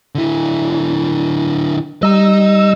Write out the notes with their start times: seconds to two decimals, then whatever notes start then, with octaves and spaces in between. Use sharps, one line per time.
0.15 D3 E4
2.03 G3 D#5 A#5 E6